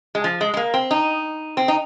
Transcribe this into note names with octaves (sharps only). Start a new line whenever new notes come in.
G#3
F3
G#3
G#3
A#3
C4
D#4
C4
D#4